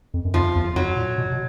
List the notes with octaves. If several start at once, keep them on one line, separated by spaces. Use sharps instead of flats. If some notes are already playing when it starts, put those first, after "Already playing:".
F2
F#2
F2 F3
E2
F2 F#3
A#2
B2
B2